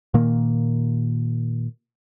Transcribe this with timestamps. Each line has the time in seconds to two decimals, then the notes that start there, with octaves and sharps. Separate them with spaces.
0.14 A#2 D#3 A#3